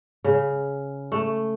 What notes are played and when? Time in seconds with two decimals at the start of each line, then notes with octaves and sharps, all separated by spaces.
0.24 C#3
1.12 A3